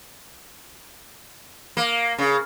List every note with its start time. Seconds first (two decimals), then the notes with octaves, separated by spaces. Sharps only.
1.77 A#3
2.18 C#3